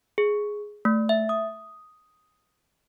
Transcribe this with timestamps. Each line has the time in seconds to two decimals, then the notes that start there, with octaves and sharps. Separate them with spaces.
0.18 G#4
0.85 A3
1.09 E5
1.29 D#6